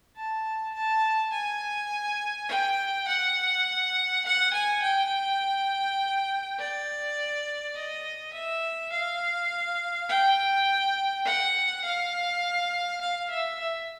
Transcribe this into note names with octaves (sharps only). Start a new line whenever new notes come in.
A5
A5
G#5
G5
F#5
F#5
G#5
G5
D5
D#5
E5
F5
G5
F#5
F5
F5
E5
E5